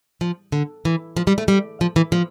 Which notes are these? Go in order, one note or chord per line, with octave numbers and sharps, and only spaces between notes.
F3
D3
E3
F3
G3
A3
G3
F3
E3
F3